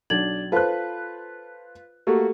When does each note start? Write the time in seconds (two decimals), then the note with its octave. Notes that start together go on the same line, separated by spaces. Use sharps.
0.10 B1 D4 G#6 A6 F#7
0.52 F4 A4 B4 C5 A5 F#6
2.07 A3 A#3 F#4 G4 A4